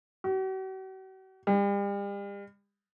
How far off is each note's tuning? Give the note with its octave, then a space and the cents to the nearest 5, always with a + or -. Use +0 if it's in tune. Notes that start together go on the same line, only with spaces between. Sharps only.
F#4 +45
G3 +40